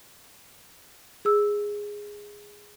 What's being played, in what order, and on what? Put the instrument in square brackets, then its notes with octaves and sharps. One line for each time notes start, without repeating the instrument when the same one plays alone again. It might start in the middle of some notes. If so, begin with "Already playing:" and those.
[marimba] G#4 E6